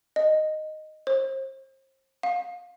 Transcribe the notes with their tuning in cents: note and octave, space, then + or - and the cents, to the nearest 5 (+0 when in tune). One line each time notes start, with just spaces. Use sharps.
D#5 -5
C5 +35
F5 +25